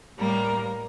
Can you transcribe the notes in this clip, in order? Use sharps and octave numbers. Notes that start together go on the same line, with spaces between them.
A2 G3 A#3 A#4